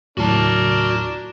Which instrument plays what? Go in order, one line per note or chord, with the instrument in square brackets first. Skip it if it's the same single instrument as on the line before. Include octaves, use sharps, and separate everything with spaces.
[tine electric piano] D#2 A2 F#3 [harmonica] D4 A#4 [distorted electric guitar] F#4 A5